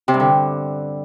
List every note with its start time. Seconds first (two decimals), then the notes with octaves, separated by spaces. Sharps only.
0.08 C3
0.14 G2
0.20 D3